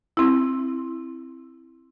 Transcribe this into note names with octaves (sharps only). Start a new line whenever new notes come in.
C4 E4